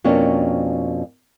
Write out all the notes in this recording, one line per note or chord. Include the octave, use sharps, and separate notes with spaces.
F2 B2 A#3 C#4 D4